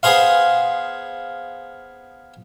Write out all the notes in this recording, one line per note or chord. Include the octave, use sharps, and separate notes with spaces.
B3 G#4 C5 F5